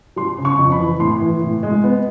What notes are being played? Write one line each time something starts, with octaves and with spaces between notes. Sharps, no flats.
G3 C6
C#3
C#6
F2
B5
E3
A2 C6
E3
A2
G#3
B3